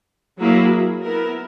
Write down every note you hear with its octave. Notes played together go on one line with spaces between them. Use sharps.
F#3 A#3 E4 G#4
B3 E4 A#4